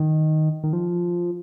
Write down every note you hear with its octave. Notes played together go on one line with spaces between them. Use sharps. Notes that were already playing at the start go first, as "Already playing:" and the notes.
Already playing: D#3
D#3
F3